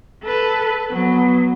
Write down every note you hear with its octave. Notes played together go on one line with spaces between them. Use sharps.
A4 B4
F#3 B3